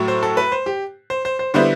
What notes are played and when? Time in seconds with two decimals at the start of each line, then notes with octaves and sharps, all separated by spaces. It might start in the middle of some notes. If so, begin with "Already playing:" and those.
Already playing: A2 F#3 A3
0.08 C5
0.23 A4
0.37 B4
0.52 C5
0.66 G4
1.10 C5
1.25 C5
1.39 C5
1.54 D3 G3 B3 E4 C5